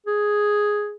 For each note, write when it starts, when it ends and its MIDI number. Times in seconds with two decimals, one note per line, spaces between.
0.06 0.95 68